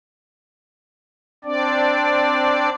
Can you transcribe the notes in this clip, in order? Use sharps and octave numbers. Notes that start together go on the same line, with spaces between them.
C4 D4 D5